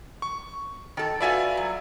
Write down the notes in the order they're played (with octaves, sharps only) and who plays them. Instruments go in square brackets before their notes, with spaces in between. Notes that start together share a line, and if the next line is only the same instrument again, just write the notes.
[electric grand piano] C#6
[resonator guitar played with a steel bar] D#3 A4
[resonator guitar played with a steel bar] F4 F#4 B4 [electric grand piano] D5 E5 G#5
[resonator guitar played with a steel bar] F#3